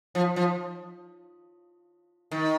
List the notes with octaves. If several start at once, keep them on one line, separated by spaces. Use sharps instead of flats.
F3
F3
D#3